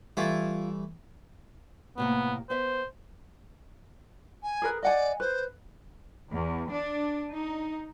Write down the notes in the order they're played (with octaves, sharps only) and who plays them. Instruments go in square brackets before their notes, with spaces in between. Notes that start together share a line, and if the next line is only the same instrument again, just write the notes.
[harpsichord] E3 A3 [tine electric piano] G3 [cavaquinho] E4 F4
[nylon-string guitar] A2 C3 A#3 [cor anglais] B3
[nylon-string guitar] B3 E5 [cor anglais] C5
[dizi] G#5
[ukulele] G#4 A#4 B4
[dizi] D5 [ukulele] D#5 F#5 G#5
[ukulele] B4 [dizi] C5
[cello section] E2
D4
D#4